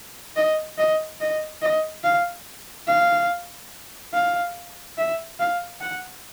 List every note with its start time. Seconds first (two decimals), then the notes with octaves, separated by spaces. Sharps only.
0.36 D#5
0.78 D#5
1.21 D#5
1.62 D#5
2.04 F5
2.88 F5
4.14 F5
4.98 E5
5.39 F5
5.81 F#5